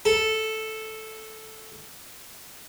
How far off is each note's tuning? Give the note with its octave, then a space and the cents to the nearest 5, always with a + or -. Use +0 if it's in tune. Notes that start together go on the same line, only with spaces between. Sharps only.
A4 -5